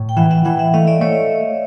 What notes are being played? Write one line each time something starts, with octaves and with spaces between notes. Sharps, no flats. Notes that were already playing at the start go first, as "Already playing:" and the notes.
Already playing: A2
G5
E3 E5 F#5
E5 F#5
E3 E5 F#5
E5 F#5
A3 D#5 F5
D5 E5
A3 C#5 D#5